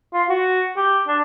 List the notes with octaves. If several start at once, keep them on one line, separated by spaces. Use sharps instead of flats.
F4
F#4
G4
D4